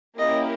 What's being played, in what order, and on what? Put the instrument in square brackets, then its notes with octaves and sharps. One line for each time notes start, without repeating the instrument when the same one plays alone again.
[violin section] A#3 C#4 E4 G4 A#4 [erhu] D#5